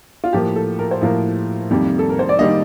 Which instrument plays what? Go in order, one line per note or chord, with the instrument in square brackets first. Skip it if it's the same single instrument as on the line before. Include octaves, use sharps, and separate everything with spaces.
[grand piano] F4
A2 F3 A#3 G4
A4
A#4
C5
A2 F3 A#3 A#4
F2 D#3 G3 A#3
A4
A#4
C5
D5
D#3 G3 A#3 D#5